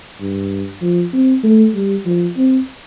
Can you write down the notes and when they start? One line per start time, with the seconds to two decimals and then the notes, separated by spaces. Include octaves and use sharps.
0.21 G2
0.82 F3
1.13 C4
1.43 A3
1.75 G3
2.06 F3
2.37 C4